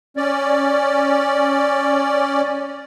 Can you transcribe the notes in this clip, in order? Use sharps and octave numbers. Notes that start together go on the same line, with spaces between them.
C#4 D5